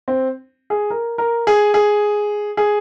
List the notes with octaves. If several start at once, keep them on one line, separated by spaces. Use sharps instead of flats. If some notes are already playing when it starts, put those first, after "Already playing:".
C4
G#4
A#4
A#4
G#4
G#4
G#4